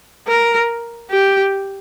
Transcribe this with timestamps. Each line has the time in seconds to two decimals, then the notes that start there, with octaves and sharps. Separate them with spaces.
0.28 A#4
1.11 G4